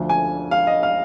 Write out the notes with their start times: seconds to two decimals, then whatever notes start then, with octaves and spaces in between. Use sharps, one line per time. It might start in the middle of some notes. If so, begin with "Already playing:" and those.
Already playing: D2 D3 F3
0.09 G#5
0.51 F5
0.67 D#5
0.83 F5